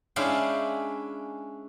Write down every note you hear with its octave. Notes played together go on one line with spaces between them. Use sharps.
G#3 C#4 D4 E4 F5 G5